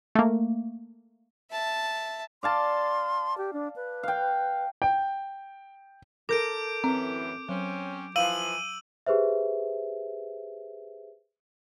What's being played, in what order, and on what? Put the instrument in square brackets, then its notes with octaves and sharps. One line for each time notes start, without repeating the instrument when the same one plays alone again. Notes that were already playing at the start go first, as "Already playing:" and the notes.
[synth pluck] A3 A#3
[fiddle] E5 A5
[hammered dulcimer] D5 F5 A5 [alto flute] C6
[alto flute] G4
D4
B4
[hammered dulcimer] F5 G5
[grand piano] G5
[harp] A4 A#4 [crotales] D6 G6 D7
[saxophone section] F#2 A2 E3 [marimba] C4
[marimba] F#3 [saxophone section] C4 C#4
[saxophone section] E3 F3 [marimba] F5 [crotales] E6 D#7 F#7
[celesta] G4 G#4 B4 C5 E5